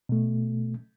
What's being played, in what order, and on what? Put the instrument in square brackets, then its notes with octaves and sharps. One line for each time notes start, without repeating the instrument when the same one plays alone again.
[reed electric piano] B2 A3